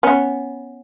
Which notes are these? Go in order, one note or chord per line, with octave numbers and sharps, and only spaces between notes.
B3 C#4